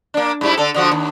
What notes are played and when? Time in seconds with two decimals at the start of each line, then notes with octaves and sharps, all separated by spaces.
0.14 A#3 D4
0.41 G#2 G3 E4
0.57 D3 A4
0.74 D3 F3 F#4
0.91 D#2